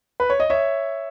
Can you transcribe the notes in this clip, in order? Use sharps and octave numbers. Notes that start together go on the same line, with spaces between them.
B4
C#5
D#5
C#5 E5